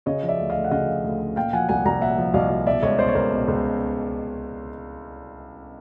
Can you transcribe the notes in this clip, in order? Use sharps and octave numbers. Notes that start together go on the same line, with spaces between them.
C#3 C#5 D#5
F3
D5 E5
D2
D#5 F5
D2
F#5
C#3 D#5 F5
F3
D2
D2
A#2 F5 G5
F3 F#5 G#5
C2 F#5 G#5
C2 G#5 A#5
A#2 E5 F#5
F3
C2 D#5 F5
C2
B2 D5 E5
C#2 C#5 D#5
B2 C5 D5
C#5
C#2 A#4 C5
B2
C#2